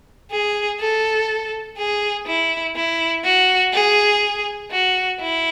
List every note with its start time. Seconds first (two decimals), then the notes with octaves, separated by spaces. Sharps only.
0.31 G#4
0.80 A4
1.78 G#4
2.27 E4
2.76 E4
3.24 F#4
3.73 G#4
4.71 F#4
5.21 E4